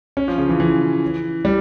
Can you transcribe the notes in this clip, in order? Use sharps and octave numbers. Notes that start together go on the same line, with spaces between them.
C#4
F3
C#3
E3
E3
G3